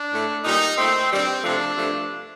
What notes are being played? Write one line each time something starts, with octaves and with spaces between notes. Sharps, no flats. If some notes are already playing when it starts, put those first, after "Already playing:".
Already playing: D4
A2 A3
A#2 G3 D#4
A#2 A3 C4
G2 D#3 G3 C4
C3 F3 A3 D4
G2 F3 A3